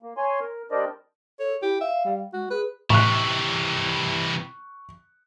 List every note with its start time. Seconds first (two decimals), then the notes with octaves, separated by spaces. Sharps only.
0.02 A#3
0.17 C#5 G#5 C6
0.40 A#4
0.71 G3 D4 A#4 C5 D5 D#5
1.40 A4 C#5
1.62 E4 G4
1.81 E5 F5
2.05 G3
2.33 G#3 F#4
2.50 G#4 B4
2.90 A2 C3 E3 C#6 F#6